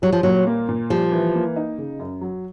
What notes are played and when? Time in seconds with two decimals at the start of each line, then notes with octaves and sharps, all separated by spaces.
0.02 F#3 G3
0.12 F3
0.23 A#2 F#3
0.47 A#3
0.69 A#2
0.90 F3 G3
1.12 E3
1.35 A#3
1.56 D#4
1.78 C#3
1.99 F#2
2.21 F#3